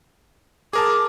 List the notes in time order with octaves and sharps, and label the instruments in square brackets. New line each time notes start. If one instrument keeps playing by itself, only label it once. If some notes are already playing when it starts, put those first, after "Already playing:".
[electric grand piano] G#4 A#4 A5 [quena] D6